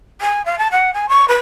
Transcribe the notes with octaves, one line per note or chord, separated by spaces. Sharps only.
G#5
F5
A5
F#5
G#5
C#6
B4